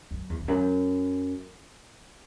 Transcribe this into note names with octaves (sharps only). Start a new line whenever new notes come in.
F#2
E2
E2
F#2